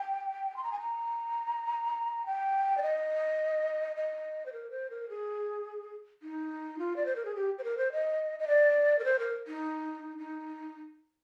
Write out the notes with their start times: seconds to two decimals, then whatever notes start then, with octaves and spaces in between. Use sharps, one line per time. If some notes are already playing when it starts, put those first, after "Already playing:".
Already playing: G5
0.56 C6
0.64 A#5
0.72 G#5
0.80 A#5
2.26 G5
2.78 D5
2.82 D#5
3.96 D#5
4.46 C5
4.53 A#4
4.71 C5
4.90 A#4
5.09 G#4
6.23 D#4
6.79 F4
6.96 D5
7.06 C5
7.16 A#4
7.25 G#4
7.36 G4
7.58 C5
7.64 A#4
7.78 C5
7.92 D#5
8.39 D#5
8.48 D5
8.99 A#4
9.05 C5
9.19 A#4
9.47 D#4
10.18 D#4